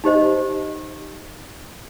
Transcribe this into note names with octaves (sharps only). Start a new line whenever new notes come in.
D#4 G4 C5 D#5